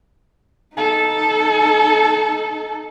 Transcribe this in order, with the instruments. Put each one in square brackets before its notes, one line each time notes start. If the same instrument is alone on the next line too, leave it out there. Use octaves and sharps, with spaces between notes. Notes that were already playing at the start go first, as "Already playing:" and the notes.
[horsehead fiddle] D#4 A4